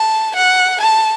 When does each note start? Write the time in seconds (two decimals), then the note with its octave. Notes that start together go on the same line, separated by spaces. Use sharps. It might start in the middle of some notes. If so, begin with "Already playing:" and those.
Already playing: A5
0.36 F#5
0.81 A5